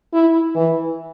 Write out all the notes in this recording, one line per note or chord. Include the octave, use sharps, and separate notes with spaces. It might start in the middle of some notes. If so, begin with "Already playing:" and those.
E4
E3